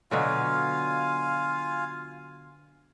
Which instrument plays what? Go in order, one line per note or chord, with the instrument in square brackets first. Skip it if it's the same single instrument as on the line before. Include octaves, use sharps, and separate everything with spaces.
[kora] B2 D3 F#3 [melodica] F4 F5 G#5